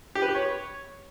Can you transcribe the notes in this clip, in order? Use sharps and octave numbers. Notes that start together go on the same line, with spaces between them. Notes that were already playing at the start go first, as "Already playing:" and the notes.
G4
B4
G4
C#5